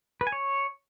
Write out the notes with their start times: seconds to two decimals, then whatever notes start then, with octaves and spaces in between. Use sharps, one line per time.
0.21 B4
0.27 G#5
0.32 C#5